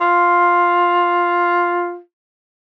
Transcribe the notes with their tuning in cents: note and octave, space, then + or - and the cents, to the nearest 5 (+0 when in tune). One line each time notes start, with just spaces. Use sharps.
F4 +5